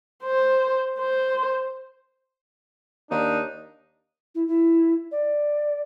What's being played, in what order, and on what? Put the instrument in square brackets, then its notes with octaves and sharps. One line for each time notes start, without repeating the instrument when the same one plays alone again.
[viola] C5
C5
[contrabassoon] D#2 [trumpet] D4 [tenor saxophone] D#4
[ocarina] E4
E4
D5